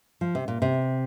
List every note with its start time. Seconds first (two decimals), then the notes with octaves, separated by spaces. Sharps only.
0.21 F3
0.35 C3
0.48 A#2
0.62 C3